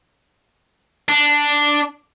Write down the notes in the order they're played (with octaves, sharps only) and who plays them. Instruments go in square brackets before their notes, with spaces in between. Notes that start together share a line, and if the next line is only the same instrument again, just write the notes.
[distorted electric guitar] D4